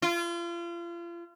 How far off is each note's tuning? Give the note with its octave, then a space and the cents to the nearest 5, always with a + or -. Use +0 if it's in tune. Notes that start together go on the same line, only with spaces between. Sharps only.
F4 -35